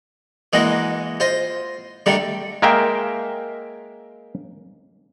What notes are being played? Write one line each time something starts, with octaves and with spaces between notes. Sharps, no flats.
E3 G#3 A#3 D#4 F#4
F4 C5 D#5
D3 D#3 G3 A3 D#4
G#3 A#3 A#4 E5 F5 G5